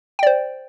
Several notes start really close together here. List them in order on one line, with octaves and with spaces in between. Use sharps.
G5 D5 C5